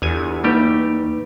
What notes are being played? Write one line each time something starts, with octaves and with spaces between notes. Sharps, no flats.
G1 E2 G#5
G3 A3 A#3 D#4 G4 B4